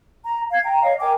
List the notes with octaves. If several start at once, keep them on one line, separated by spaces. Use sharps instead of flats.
A#5
F5 G#6
G5 A#5
C#5 D#5 F5
A#4 G5 G#5 D6